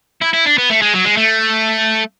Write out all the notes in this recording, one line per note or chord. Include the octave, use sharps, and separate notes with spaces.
E4
E4
D4
B3
A3
G#3
F#3
G#3
A3